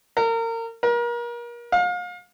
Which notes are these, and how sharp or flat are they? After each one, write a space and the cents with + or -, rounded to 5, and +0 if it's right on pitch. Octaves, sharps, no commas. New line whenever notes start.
A#4 -30
A#4 +35
F5 +35